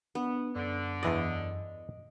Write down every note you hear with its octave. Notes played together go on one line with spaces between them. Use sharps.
B3 D4
F#2 D3
E2 E3 D5 D#5